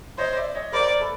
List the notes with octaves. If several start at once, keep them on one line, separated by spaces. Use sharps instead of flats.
C5 C#5 D#5
D5 E5
C#5 D#5
A#4 C5 D5
A4 B4